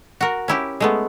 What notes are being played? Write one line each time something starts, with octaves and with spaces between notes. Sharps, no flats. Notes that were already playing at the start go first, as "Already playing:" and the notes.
F#4 A#4
C#4 E4 G4
G#3 A3 B3